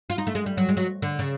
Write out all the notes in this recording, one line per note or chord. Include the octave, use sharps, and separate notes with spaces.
F4
D#4
A3
G#3
G3
F#3
G#3
F#3
D3
C#3